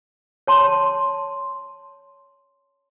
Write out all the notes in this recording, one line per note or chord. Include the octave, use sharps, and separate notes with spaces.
C#5 A5 C6